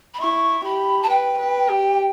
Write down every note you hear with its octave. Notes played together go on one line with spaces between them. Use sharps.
B5
E4 C#6
G4 B5
A5
B4 G5
B4
G4